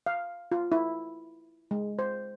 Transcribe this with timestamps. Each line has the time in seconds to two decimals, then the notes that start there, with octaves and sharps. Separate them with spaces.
0.06 F5
0.51 F4
0.72 E4
1.71 G#3
1.99 C5